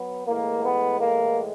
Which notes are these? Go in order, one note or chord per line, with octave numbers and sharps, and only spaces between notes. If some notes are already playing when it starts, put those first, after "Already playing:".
Already playing: F#3 B3
A2 E3 G#3 A#3
B3
A#3